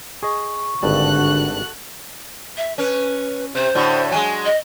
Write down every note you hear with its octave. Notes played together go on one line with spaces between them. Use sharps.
G#4 D#5 C#6
G#1 G2 D3 F#4 A4 A5 F#6
E5
C#4 B4
C3 C5
A2 D3 F#4
F#3 G#3 G#5
D#5